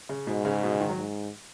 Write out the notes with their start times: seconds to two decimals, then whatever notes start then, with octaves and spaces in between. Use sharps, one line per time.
0.09 C#3
0.27 G#2 B2
0.45 C#3
0.63 B2
0.72 C#3
0.80 D#3
0.89 F#3
0.98 G#2